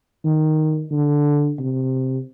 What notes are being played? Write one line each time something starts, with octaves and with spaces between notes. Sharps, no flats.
D#3
D3
C3